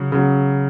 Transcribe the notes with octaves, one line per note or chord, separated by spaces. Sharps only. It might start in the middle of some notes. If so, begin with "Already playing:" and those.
Already playing: C#3 F#3
C#3 F#3